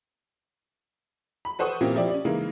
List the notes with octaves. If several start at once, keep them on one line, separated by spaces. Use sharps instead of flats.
B5
A4 B4 C5 F#5 C#6 D#6
A#2 E3 A#3 C4 C#4 G4
F3 E4 G4 D5
C#4 D5
C#3 E3 G#3 A#3 D#4